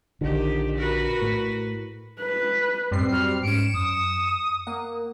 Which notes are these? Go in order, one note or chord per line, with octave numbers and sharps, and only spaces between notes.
A#1 D3 D#3 G4
F#4 A#4 B4
A2
B4
F#2 A2 G3 C4 C7
F#4 F6
G#2 C#4 C#7 D7 E7
F#2 D#6
A#3 F#5